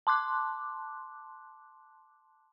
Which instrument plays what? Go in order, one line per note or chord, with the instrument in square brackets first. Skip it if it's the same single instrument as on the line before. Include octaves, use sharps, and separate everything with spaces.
[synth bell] A5 C6 D6 F#6